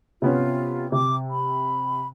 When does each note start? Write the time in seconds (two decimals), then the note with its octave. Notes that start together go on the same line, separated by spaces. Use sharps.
0.22 C3 B3 C#4 F4
0.92 C3 D6
1.30 B5